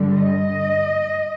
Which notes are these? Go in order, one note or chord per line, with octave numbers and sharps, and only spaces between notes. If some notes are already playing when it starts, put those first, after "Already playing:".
Already playing: G2 D3 G3
D#5